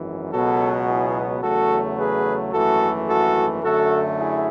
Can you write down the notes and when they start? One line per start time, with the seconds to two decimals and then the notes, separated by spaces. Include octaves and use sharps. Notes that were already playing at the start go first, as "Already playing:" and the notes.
Already playing: G#1 F#2 E3
0.31 C#2 B2 F#3 B3 F#4 A4
0.86 E4 G#4
1.41 E2 C#3 F#3 A3 F#4 A4
1.97 G#4 B4
2.52 G#1 F#2 E3 A3 F#4 A4
3.07 F#4 A4
3.62 F#2 D3 A3 F#4 A4
4.17 E4 G#4